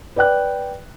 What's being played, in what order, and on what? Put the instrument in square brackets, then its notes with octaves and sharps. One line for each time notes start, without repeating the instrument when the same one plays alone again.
[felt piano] B4 D5 G5 F#6